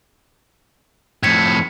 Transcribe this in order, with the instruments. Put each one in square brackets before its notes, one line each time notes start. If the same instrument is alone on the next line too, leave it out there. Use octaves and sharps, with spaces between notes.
[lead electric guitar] F2 A2 [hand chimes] G#6 B6 C#7